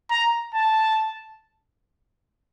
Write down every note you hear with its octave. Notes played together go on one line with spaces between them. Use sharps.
A#5
A5